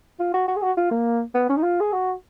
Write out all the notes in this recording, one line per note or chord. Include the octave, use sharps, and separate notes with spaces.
F4
F#4
F#4
G#4
F#4
F4
A#3
B3
C#4
D#4
F4
G#4
F#4